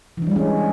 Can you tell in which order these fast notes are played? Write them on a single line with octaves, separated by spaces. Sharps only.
E3 D4 G3 G#3 C#4